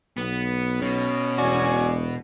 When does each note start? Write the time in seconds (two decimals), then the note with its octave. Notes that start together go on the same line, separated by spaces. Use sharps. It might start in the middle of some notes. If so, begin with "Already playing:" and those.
0.17 B1 B3
0.81 B2 C#4
1.37 E1 F#4 D5 G#5